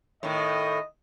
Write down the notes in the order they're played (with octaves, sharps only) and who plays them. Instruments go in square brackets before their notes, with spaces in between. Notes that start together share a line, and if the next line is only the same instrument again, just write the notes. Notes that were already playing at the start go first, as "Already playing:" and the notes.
[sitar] A2 D#3 [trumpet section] D#5